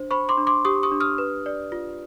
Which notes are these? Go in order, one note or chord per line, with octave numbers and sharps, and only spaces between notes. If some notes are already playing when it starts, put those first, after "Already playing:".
Already playing: D4 C5
C5 B5 C#6
C6 D6
D4
C6 D6
G4 C#6 D#6
C#6 D#6
D4
D#6 F6
B4
D5
F4